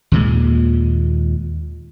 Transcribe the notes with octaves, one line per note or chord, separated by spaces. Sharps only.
D#2 A#2 G#3